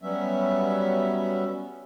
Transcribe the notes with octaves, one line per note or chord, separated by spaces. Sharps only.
F#3 G3 B3 C#4 E5